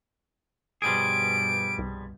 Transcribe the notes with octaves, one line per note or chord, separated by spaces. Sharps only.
G2 B2 F3 G3 G#4 D7
C2